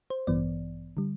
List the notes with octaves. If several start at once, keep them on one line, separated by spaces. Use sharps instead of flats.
C5
A1 G2 E3 B3 D5
D3 G3